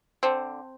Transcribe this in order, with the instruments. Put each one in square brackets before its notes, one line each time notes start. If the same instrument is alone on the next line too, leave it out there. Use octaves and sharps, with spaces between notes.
[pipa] D3 C4